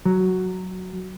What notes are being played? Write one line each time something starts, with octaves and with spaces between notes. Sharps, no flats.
F#3